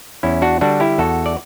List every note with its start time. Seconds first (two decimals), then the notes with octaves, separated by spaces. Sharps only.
0.23 E2 C#4 E4
0.42 D4 F#4
0.61 D3 G3 D4 F#4
0.80 E4 G4
0.98 E2 F#4 A4
1.26 D5